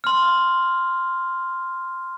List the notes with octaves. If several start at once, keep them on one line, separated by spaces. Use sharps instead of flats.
C6 F6